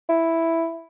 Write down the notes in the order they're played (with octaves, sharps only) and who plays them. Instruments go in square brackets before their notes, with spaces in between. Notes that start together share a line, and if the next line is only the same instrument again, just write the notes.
[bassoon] E4